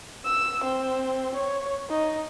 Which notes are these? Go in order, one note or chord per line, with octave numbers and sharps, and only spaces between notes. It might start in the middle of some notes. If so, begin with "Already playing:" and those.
E6
C4
C#5
D#4